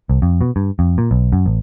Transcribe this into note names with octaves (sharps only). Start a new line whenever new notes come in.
C2
F2
B2
G2
F2
A#2
B1
F#2
A1